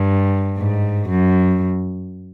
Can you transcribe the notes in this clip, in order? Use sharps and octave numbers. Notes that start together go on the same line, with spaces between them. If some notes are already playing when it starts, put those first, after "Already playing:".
Already playing: G2
G#2
F#2